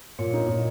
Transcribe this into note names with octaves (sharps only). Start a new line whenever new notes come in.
A#2 C#5
D#4
A#2